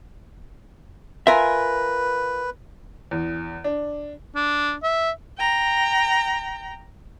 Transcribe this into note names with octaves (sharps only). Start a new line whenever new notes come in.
F4 A#4 B4 E5 G#5
E2
D4
D4
E5
G5 A#5